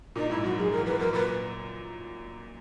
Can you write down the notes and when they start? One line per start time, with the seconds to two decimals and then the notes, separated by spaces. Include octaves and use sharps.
0.16 A#2 D#4
0.30 G#2 E4
0.43 F#2 F#4
0.58 F#2 G#4
0.71 A#4
0.78 E2
0.86 B4
0.99 F#2 A#4
1.13 A#2 B4